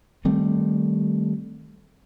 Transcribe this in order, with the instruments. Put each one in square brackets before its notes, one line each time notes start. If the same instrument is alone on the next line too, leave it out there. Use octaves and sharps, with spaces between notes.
[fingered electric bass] D#3 G3 A3 C4